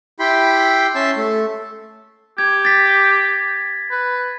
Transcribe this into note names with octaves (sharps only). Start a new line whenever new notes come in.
E4 G4 G5 B5 C6
C#4 E5 A5 C6
A3
G4 G#6
A6 B6
B4